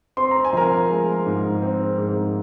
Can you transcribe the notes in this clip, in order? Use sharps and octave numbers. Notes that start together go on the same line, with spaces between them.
C4 C6
A#5
G#5
F3 A#4 A#5
G#3
G#2
C4
G#2